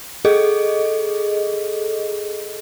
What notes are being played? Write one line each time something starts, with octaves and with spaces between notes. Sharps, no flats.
G#4 A4 D#5